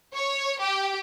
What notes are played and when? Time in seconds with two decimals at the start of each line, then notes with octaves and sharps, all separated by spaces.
0.15 C#5
0.60 G4